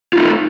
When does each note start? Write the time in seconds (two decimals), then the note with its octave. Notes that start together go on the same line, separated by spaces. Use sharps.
0.13 F4
0.16 D#4
0.18 A3